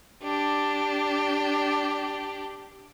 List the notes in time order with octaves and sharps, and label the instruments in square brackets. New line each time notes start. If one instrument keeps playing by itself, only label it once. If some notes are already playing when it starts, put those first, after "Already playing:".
[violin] D4 G4